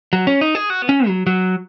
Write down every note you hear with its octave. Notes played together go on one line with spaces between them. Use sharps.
F#3
C#4
D#4
G#4
F#4
B3
C#4
F#3
F#3